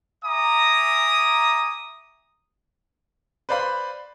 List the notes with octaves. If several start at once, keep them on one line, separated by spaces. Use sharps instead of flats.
E5 G#5 A#5 D6 D#6
B4 C5 D5 F5 B5